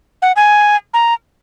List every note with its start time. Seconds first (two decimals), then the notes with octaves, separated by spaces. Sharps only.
0.22 F#5
0.36 G#5
0.94 A#5